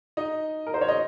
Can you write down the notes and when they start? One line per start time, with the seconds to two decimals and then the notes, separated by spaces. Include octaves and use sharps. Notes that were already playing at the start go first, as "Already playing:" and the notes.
0.17 D#4 D#5
0.67 A#4
0.74 C5
0.81 C#5
0.88 D#5